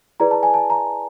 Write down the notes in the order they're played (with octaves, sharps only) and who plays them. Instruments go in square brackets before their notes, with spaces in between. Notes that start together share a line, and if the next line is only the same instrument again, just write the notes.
[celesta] E4 G#4 B4 D5 A#5
A5
G#5
A5
A#5